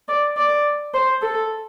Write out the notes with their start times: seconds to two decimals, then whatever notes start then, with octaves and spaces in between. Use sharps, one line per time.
0.08 D5
0.37 D5
0.94 C5
1.22 A4